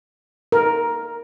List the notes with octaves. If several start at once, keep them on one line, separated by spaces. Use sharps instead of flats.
A#4